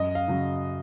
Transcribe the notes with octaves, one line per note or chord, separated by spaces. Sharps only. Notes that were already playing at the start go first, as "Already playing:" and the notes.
Already playing: F#2 D#5
F5
C#3 F#3